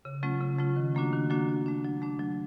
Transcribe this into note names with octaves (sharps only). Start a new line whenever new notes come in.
C#3
F#3 A3 C#4 F4
C#3
F#3 A3 C#4 F4
D#3
F#3 A#3 D4 F#4
D#3
F#3 A#3 D4 F#4
F#3
A3 D4
F#3
A3 D4
F#3